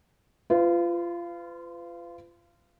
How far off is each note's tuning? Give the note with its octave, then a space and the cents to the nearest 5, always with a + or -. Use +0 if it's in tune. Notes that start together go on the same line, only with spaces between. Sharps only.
F4 -20 B4 +40